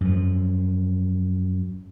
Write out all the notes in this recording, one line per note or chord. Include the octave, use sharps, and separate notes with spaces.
F#2 F3